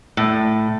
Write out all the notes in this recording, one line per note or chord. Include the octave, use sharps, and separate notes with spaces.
A2